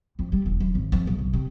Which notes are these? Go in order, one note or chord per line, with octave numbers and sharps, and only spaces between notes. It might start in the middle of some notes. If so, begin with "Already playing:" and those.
F2
G3
E1
F#2
G#1
F2
B1
B1
C3